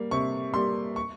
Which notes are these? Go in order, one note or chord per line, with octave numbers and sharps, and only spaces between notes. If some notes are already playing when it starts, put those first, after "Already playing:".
Already playing: G3 A#3
C3 C#6
G3 A#3 C6
C#6